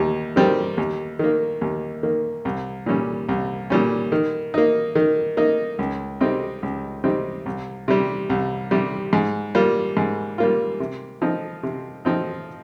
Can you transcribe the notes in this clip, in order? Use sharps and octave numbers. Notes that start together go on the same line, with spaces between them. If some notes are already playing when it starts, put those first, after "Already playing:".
Already playing: D#2 G3
D#3 G3 C4 G4
D#2
D#3 A#3
D#2
D#3 A#3
C2
A#2 G3 C#4
C2
A#2 G3 C#4
D#3
A#3 D#4
D#3
A#3 D#4
C#2
C3 G3 C4 D#4
C#2
C3 G3 C4 D#4
C2
C3 G3
C2
C3 G3
G#2
G3 A#3 F4
G#2
G3 A#3 F4
C3
F3 C4 D#4
C3
F3 C4 D#4